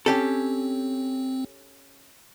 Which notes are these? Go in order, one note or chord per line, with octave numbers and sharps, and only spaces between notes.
C4 C#4 G4 A4